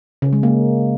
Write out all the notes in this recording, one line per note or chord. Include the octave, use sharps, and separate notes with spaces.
C#3
G#3
A#3